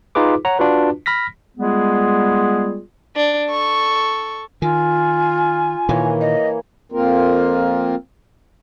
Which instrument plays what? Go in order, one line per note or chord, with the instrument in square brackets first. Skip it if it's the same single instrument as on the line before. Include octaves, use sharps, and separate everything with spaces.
[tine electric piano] D#4 F4 G#4 B4 D6
C#5 F#5 A#5
D4 F4 F#4 B4
B5 F6 A#6 B6
[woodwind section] G3 G#3 B3 F4 G#4
[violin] D4
A4 C#6
[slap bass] D#3 [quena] F4 [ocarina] G#5
[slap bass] A#2 D#3 [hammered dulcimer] E3 A#3 C#5
[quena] D#5
[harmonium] F2 A#3 C4 F4 A#4